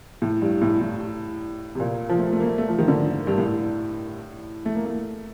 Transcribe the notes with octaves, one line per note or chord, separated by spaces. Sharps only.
A2
G2
A2
A2
C3
A#2
F3
A3
A3
A#3
A3
A3
F3
D#3
D3
G2
A2
A3
A#3
A3